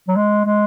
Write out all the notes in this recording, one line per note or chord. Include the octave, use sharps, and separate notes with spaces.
F#3
G#3
G#3